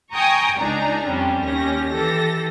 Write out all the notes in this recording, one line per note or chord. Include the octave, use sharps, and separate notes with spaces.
G5 G#5 A#5 C#6 D#6
C#2 D4 D#4 G#4 A#5
F2 G3 C#4 D4
D#2 C#4 G4 A#6
E3 G4 A4 A#6